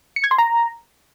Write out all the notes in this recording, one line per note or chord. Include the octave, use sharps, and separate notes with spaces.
C#7
G#6
C6
A#5